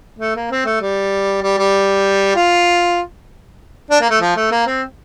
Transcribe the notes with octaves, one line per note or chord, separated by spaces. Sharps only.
A3
A#3
C4
A3
G3
G3
G3
F4
D4
A#3
A3
F3
A3
A#3
C4